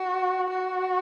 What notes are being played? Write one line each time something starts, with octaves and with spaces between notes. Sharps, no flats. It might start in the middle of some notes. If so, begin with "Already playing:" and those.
Already playing: F#4
F#4